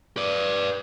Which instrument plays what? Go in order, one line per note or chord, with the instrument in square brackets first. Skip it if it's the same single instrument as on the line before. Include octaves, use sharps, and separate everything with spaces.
[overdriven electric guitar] B4 D5